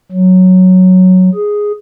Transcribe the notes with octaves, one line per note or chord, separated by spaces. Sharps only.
F#3
G#4